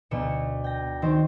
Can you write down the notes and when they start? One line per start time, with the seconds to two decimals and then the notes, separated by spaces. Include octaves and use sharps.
0.11 D2 B2 C#7 E7
0.64 G5 A#6
1.02 D#3 C4 C5 C#6